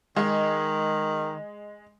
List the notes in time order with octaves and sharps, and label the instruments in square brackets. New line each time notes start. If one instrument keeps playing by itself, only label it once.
[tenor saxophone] D#3 [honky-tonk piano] G#3